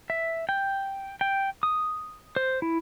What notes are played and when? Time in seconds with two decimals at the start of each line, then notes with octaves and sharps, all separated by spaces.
0.10 E5
0.49 G5
1.21 G5
1.63 D#6
2.36 C5
2.62 E4